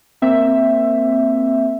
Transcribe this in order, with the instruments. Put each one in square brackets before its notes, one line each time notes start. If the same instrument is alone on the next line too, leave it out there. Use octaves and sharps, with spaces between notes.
[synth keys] A#3 C4 E5